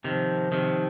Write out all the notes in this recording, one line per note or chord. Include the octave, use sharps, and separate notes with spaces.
C3 D#3 F3
C3 D#3